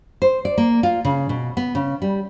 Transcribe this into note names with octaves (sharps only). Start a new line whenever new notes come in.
C5
D5
A#3
F4
C#3
B2
B3
C#3
G3